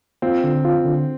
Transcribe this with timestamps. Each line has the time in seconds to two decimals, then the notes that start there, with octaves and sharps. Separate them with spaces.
0.22 C4 F4
0.44 D3
0.65 F4
0.85 D3